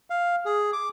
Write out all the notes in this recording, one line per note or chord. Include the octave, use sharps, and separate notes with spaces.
F5
G#4
D6